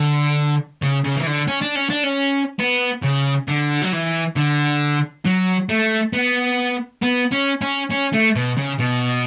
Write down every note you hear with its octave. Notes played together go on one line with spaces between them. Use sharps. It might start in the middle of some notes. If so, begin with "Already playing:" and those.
Already playing: D3
C#3
C#3
E3
D3
C#4
D4
C#4
D4
C#4
B3
C#3
D3
F#3
E3
D3
F#3
A3
B3
B3
C#4
C#4
C#4
A3
B2
C#3
B2